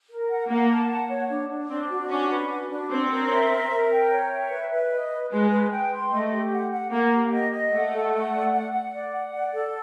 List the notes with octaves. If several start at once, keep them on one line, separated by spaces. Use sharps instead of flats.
A#4
F#5
A#3 F#5
A5
F#5
C#5
D4
D4
C4 D4
F#4
C#4 D4
B4
F#4
D4
C4 C#5
A#4
E5
A#4
A#4
G5
C#5
E5
B4
B4
D#5
B4
G#3 B4
B4
G5
C6
A3 D#5
G4
F#5
F#5
A#3 F#5
G4
D#5
D#5
A3 F#5
A4
F#5
D5
F#5
F#5
D5
F#5
D5
A4